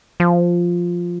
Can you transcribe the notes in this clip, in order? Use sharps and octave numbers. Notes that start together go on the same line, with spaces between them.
F3